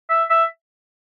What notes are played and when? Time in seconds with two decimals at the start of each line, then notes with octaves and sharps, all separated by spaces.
0.09 E5
0.30 E5